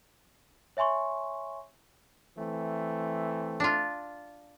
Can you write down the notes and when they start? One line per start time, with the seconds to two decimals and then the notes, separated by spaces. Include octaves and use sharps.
0.77 C#5 E5 G#5 C6 C#6
2.38 E3 A3 C4
3.60 D4 F4